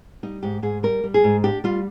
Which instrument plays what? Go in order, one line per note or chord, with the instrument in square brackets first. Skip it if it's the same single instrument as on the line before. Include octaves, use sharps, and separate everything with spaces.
[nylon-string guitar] G3 D#4
G#2 G4
G#2 G#4
G3 A#4
G3
G#4
G#2
D4 G4
G3 F4